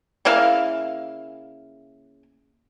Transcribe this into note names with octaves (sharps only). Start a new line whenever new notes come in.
C#3 A#3 E4 F5